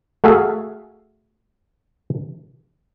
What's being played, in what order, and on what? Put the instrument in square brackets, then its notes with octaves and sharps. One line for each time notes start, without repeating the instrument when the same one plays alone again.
[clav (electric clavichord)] A3 F#4 G#4 A4 E5 F5